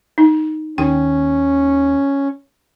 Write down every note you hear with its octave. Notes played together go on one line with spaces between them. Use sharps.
D#4
D#2 C#4 G5